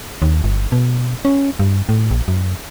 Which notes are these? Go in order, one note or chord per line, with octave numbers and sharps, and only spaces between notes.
D#2
G1
B2
C#4
G2
A2
A#1
F#2